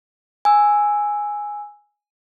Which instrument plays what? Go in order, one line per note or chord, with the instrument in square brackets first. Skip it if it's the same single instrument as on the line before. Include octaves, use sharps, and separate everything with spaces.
[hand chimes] G#5 E6